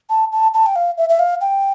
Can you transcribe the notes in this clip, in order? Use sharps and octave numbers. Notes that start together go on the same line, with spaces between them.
A5
A5
A5
G5
F5
E5
E5
F5
G5